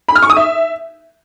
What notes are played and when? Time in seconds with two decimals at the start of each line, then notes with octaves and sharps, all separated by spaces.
0.08 B5
0.16 F6
0.23 C#6
0.30 D#6
0.37 E5